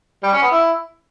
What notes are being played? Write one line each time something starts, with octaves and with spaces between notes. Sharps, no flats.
G3
C#4
B3
E4